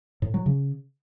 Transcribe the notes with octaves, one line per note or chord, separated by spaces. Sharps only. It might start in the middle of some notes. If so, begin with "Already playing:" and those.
A2
F#3
C#3